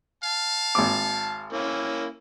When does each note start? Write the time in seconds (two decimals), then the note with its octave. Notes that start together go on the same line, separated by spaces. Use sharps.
0.24 F5 A5
0.75 G#1 D6
1.53 A#3 C#4 E4